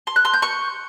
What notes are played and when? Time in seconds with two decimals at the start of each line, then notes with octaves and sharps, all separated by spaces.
0.07 C6
0.16 F#6
0.25 C6
0.34 G6
0.42 C#6